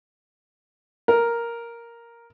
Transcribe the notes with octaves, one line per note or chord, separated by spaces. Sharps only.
A#4